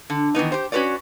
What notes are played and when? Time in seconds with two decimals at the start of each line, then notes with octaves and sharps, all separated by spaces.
0.10 D3
0.35 D#3 E3 B3 D#4
0.52 G4 C5
0.72 C#4 F#4 A#4 B4 C#5 D5